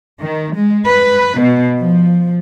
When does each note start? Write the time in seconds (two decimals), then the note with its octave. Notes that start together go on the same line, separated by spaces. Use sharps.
0.19 D#3
0.55 G#3
0.86 B4
1.40 B2
1.79 F3